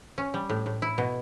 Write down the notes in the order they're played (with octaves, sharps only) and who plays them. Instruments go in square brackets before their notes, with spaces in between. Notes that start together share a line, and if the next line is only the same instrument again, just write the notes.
[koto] C#4
G3
A2
A2
E4
B2